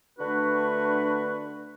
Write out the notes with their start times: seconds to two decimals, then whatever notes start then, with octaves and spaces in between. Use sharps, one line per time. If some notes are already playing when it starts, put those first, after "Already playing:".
0.19 D3 A3 D4 F#4 B4